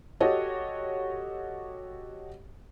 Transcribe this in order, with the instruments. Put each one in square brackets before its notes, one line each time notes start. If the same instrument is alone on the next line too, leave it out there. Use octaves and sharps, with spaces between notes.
[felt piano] F#4 G4 A4 C#5 D#5